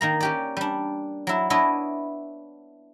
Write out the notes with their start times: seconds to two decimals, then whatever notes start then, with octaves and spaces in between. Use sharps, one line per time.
0.01 D#3 A#3 A#5
0.20 C#4 G4 D5
0.57 G3 D4
1.27 F#3 E4
1.50 B3 D4 E4 B4 C#5 D#5